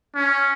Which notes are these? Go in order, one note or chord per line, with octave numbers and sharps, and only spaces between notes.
C#4